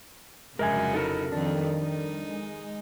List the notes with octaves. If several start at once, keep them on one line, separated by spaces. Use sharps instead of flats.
F1 F2 C#3 F#3 G#3 A#4 E5 G#5
D#4 E4 A4 A#4
F2 D#3 G3 D4
D#4
G#3